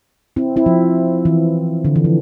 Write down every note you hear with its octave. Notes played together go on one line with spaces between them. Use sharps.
C4 E4
C4 E4
F3
E3
D3
E3
F3